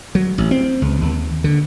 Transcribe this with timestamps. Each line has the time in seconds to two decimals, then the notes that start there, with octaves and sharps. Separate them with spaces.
0.15 F#3
0.38 A1
0.51 C4
0.82 C#2
1.02 D#2
1.44 D3